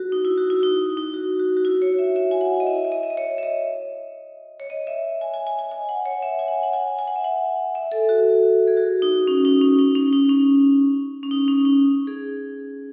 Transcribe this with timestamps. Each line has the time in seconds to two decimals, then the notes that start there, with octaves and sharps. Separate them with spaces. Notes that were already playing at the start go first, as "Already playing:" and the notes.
Already playing: F#4
0.12 D#4
0.25 E4
0.37 F#4
0.50 E4
0.63 D#4
0.97 D#4
1.14 F#4
1.39 F#4
1.57 F#4
1.65 E4
1.82 C#5
1.99 E5
2.16 E5
2.31 G#5
2.41 F#5
2.60 D#5
2.67 E5
2.85 E5
2.92 D#5
3.03 E5
3.10 D#5
3.17 C#5
3.38 E5
3.43 D#5
4.60 C#5
4.70 D#5
4.87 E5
5.21 G#5
5.34 G#5
5.47 G#5
5.59 G#5
5.71 G#5
5.89 F#5
6.05 C#5
6.23 E5
6.39 G#5
6.48 F#5
6.63 F#5
6.73 G#5
6.99 G#5
7.08 F#5
7.16 E5
7.24 F#5
7.75 E5
7.92 A4
8.09 F#4
8.68 G#4
8.77 F#4
9.02 D#4
9.27 C#4
9.45 D#4
9.62 C#4
9.79 D#4
9.95 C#4
10.13 D#4
10.29 C#4
11.23 C#4
11.31 D#4
11.48 C#4
11.65 D#4
12.07 G#4